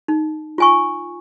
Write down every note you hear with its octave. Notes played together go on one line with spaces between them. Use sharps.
D#4
F4 G#5 C#6